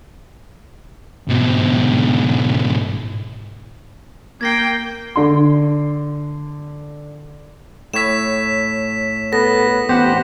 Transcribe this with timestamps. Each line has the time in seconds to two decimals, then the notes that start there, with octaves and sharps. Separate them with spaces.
1.29 G#2 B2
4.41 A#3 G5 G#6 A#6 C7
5.16 D3 C6
7.94 A2 C#5 E6 B6 E7
9.33 B3 A4 A#6
9.89 A1 B3 G4 C5 F#5